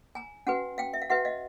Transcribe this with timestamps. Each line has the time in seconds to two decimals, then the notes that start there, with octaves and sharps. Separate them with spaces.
0.15 G#5 A#5
0.47 C#4 F#4 B4 F#5 G#5
0.78 F5 G5
0.94 E5
1.02 F5
1.10 F#4 B4 E5 F#5
1.25 D#5 F5